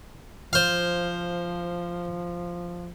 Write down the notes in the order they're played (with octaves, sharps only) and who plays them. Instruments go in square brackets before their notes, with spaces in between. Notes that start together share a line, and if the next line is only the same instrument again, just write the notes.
[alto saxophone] F3 [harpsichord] C5 F5